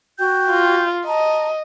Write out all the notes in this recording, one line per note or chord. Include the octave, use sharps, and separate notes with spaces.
F#4 G5 G6
F4
D#5 A5 A#5